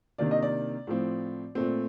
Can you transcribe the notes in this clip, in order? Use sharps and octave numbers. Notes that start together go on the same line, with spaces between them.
C3 D#3 A#3 D4 D5
D#5
D5
A2 F3 C4
A#2 A3 C4